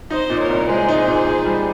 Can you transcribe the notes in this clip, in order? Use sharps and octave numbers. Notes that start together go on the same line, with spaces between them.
D#4 C5 D#5
A#2
A#4 C#5
C2
G#3 G#4 C5
D#4
A#2
D#4
G3